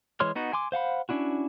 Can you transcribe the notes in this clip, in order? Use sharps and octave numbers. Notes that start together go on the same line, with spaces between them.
E3 G#3 C#5 C6 F6
B3 D#4 F#4
G#5 C6 D6
C5 F5 F#5 B5
C#4 D4 E4 F#4